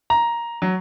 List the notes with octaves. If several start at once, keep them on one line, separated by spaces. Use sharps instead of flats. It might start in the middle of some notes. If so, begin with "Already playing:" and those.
A#5
F#3